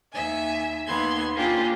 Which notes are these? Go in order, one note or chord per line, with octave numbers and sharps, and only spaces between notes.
D#2 E5 G#5
D#2 B3 C6 G#6
A#3 C#4 D4 F4 G4 G#4